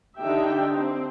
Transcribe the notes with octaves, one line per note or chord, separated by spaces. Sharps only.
D3 D4 D#4 G4 E5 G5
C4 C5